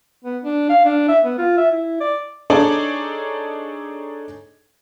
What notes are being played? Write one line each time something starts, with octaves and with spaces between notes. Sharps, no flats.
B3
D4
F5
D4
E5
B3
F4
E5
E4
D5
D4 D#4 G#4 A4 C#5 D5